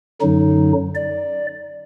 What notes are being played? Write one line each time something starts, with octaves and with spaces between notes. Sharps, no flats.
F#2 D3 F#3 D#4
D5